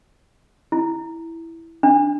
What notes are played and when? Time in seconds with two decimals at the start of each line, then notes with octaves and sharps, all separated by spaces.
0.72 E4
1.83 D4